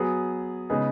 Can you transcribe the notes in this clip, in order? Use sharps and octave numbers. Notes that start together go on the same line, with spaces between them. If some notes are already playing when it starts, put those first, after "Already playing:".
Already playing: F#3 B3 G#4
C#3 G#3 B3 D#4 G#4